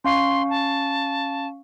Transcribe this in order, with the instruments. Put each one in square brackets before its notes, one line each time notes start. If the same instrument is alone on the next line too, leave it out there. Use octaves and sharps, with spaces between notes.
[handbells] C#4 F5 C#6 [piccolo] C6
[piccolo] A5